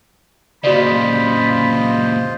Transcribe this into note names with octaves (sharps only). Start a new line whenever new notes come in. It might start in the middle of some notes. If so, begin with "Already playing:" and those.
A#2 C#3 F4 F#4 C5 D5 D#5 B5